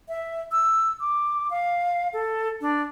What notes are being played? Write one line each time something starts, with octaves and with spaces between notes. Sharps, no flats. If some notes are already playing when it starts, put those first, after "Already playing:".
E5
E6
D6
F5
A4
D4